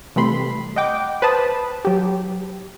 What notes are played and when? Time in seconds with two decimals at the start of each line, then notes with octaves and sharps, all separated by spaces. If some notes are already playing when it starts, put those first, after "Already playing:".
0.16 C3 E3 G3 A3 B5 C6
0.76 D#5 F#5 G5 D6
1.22 B4 C5 A5 D#6
1.85 F#3 G4